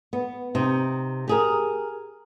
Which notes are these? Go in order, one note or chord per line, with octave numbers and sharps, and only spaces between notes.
B3
C3 D#4
G4 G#4 A#4